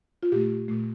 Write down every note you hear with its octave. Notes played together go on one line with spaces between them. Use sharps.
F4
A#2 A3 G4
A#2 A3